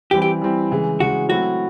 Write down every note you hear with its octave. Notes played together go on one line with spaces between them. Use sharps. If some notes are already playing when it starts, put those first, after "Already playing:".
E3 G3 C4 E4 G4
G4
E3 G3 C4 E4
C#3 E3 G#3
C#3 E3 G#3 F#4
F#3 A3 C4 E4 F#4